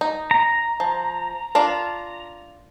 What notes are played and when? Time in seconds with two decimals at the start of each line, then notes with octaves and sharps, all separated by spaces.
0.01 D#4
0.31 A#5
0.80 F3
1.55 D4 F4 A#4